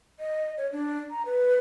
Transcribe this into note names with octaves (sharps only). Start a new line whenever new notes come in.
D#5
C#5
D4
A#5
B4